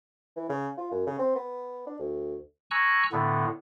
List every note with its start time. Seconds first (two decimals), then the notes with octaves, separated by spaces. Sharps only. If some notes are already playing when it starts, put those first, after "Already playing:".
0.36 E3
0.49 C#3
0.78 F4
0.91 F#2
1.07 C#3
1.19 C4
1.35 B3
1.87 D4
1.99 D2
2.71 G#5 A#5 C#6 E6 F#6
3.12 A2 D3 B3